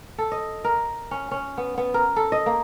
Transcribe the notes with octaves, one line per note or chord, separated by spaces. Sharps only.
A4
D#5
A#4
C#4
C#4
B3
B3
A#4
A4
D#5
A#3